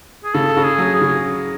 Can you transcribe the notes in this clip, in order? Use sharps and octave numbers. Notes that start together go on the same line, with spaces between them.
G#4
C#3 A4
C#3
G#4
F#3
G#4
C#3